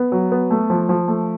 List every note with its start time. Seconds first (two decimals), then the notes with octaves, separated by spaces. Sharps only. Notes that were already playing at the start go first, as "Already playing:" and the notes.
Already playing: B3
0.12 F#3
0.32 B3
0.50 A3
0.70 F3
0.89 F3
1.08 A3